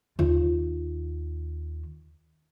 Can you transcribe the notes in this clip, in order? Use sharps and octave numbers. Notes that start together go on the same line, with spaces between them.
D#2 F4